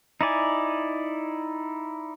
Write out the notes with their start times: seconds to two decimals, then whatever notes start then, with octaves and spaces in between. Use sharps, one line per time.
0.21 D#4 E4 D5 G#5